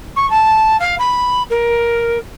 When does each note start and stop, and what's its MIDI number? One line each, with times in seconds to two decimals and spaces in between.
0.16 0.29 85
0.30 0.77 81
0.80 0.95 77
0.99 1.43 83
1.50 2.18 70